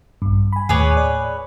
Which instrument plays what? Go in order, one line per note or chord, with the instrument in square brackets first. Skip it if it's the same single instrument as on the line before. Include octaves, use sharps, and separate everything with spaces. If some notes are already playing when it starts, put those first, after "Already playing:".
[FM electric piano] A#1 G2
G#5 B5
[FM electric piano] D#2 A2 D6 [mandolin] G#4 B4 C#5
[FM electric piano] D5